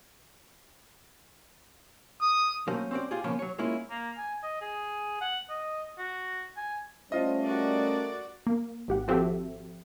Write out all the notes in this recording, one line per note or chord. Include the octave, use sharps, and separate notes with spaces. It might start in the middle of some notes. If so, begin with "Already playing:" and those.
D#6
F#3 A3 A#3 C#4 A#4 C5
C4 C#4 F#4 C5 D5
F4 G4 G#4
C#3 F3 A#3 B3 C#4
F#3 C#5
G#3 A#3 C#4 E4 F4
A#3
G#5
D#5
G#4
F#5
D#5
F#4
G#5
G3 A3 C#4 F4 C5 D#5
F#4 A#4 D5
A#3
G#1 G4 F#5
F3 C4 F#4 G4 A4 E5